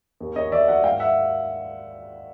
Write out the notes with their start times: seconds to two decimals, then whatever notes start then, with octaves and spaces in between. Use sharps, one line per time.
0.20 D#2
0.36 D#2 C#5 D#5
0.52 D#3 D5 E5
0.68 F#3 E5 F#5
0.84 G#2 F5 G5
1.00 E5 F#5